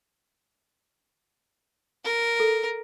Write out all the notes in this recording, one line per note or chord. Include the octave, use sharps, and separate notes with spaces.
A#4
A4